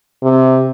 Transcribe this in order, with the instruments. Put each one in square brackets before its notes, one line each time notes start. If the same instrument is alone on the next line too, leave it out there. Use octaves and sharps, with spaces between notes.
[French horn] C3